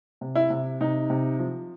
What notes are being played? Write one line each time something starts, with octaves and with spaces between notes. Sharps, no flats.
C3
E4
C3
C3 D#4
C3
F3